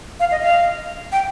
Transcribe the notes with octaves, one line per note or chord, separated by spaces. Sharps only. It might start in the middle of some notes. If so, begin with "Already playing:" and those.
F5
D#5
F5
G5